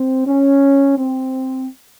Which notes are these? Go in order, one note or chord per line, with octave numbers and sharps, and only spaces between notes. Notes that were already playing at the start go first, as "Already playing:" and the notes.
Already playing: C4
C#4
C4